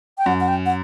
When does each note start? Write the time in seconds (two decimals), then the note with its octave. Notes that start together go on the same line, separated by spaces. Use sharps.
0.18 G5
0.26 F#2 F#5
0.41 F#5
0.48 G5
0.66 F#5